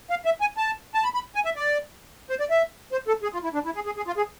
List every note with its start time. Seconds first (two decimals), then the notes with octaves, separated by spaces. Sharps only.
0.10 F5
0.25 E5
0.41 G#5
0.57 A5
0.94 A5
1.04 B5
1.14 B5
1.35 G#5
1.45 E5
1.56 D5
2.30 C5
2.40 D5
2.50 E5
2.92 C5
3.08 A4
3.23 G#4
3.33 F4
3.44 E4
3.54 D4
3.65 E4
3.75 G#4
3.86 G#4
3.97 G#4
4.07 F4
4.17 G#4